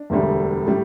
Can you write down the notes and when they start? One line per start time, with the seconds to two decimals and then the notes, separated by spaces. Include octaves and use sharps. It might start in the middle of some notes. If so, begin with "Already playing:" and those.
Already playing: D4
0.10 E1 D2 D3 G3
0.66 A2 G3